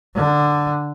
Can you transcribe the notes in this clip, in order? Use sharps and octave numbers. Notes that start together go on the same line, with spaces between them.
D3